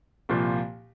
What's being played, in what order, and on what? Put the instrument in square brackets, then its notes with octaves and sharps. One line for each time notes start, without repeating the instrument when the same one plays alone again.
[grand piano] C2 A#2 F3